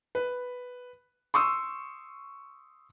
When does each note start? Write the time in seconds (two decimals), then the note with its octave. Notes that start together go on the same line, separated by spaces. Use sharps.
0.15 B4
1.34 C6 C#6 D#6 E6